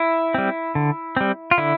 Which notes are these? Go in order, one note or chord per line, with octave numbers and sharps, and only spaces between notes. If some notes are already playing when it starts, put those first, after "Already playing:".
Already playing: E4
G3 C4
D3
G3 C4
F4
D3 E4